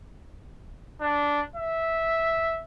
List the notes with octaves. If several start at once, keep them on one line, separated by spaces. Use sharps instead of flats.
D4
E5